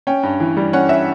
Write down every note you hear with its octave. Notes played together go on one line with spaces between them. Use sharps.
C#4 G5
G2
E3
G3
C#4 F#5
E5